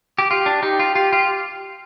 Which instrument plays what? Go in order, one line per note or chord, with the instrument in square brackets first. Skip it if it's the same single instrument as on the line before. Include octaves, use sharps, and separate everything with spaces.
[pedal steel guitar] G4
[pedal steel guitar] F4 [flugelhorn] G4
[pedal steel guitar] D4
[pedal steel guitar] D#4 [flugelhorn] G4
[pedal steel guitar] F4
[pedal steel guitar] F4 [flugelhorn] G4
[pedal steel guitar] F4